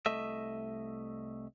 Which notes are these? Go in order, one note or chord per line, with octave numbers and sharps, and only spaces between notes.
C2 A3 D#5 E5